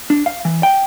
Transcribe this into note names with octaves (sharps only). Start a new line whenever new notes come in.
D4
F5
E3
G5